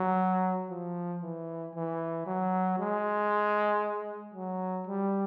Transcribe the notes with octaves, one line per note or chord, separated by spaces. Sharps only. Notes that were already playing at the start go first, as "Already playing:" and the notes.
Already playing: F#3
F3
E3
E3
F#3
G#3
F#3
G3